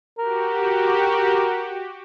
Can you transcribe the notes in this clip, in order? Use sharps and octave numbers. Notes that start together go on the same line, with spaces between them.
F#4 G4 A#4